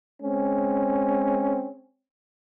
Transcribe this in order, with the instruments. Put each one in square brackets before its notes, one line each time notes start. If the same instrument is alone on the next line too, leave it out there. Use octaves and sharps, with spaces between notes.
[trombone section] G#3 C4 C#4